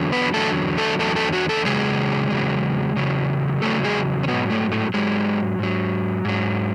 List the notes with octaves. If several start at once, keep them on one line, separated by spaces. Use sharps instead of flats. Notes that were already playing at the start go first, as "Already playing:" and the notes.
Already playing: E2 D3 F#3
B3 B4
E2 D3 F#3 A3 A4
A3 A4
E2 D3 F#3 A3 A4
A3 A4
F#3 F#4
A3 A4
E2 C#3 F#3 G#3 G#4
E2 C#3 F#3
E2 C#3 F#3
E2 C#3 F#3 A3 A4
G#3 G#4
C#4
G#2 B2 F#3 B3
A2 A3
A2 A3
G#2 F#3 G#3
G#2 F#3
G#2 F#3